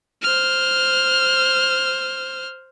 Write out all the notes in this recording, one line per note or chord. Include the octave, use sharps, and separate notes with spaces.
C5 F6